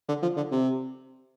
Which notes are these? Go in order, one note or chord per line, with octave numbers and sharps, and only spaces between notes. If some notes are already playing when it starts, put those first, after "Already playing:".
D3
F3
D3
C3